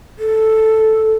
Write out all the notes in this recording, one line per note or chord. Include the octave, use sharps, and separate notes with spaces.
A4